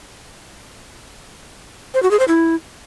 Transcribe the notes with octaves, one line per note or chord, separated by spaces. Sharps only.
C5
F#4
G#4
C5
E4